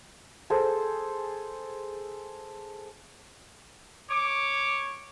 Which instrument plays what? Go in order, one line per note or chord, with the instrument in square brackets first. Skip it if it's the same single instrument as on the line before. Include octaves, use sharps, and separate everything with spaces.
[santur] G#4 A4 C5
[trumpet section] C#5 D6